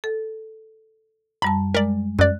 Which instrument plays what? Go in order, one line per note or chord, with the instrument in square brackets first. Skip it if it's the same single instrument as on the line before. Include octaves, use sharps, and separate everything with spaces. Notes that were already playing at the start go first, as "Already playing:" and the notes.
[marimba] A4
[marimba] F#2 G3 A5 [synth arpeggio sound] B5
[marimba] G#3 [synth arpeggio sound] A#4 D5
[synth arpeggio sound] F#2 D5 [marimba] F#6